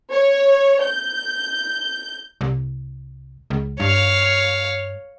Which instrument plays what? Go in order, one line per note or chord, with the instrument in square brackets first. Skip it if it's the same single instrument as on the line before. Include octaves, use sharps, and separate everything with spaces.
[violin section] C#5
G6
[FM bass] C2
C#2
[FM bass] G2 [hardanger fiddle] C#5 F5